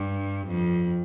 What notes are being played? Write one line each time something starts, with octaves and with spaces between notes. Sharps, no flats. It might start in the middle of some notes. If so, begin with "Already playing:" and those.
Already playing: G2
F2